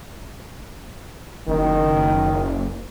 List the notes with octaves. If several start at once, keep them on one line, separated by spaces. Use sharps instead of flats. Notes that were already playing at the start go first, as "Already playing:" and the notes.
F#1 D#3